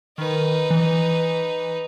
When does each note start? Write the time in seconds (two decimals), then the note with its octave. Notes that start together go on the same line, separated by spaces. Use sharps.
0.18 D#3 D#4 B4
0.70 E3